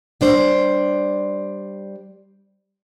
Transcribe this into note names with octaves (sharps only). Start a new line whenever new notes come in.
G3 D4 C5